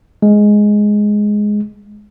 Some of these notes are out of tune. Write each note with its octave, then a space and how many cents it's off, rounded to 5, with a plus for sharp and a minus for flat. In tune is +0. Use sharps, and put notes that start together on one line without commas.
G#3 +5